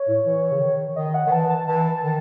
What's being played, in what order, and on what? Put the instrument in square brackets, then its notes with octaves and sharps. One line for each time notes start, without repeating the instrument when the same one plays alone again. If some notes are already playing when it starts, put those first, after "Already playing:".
Already playing: [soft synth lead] C#5
[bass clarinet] A2
E3
C#3
D#3
[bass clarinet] D#3 [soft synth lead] D#5
[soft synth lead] F#5
[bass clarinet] D#3
[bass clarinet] E3 [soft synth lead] A5
[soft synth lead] A5
[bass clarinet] E3 [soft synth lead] A5
[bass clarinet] D#3